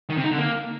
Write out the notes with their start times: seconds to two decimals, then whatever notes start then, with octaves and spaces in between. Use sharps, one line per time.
0.10 D#3
0.17 C3
0.24 D#4
0.31 D3
0.38 A#3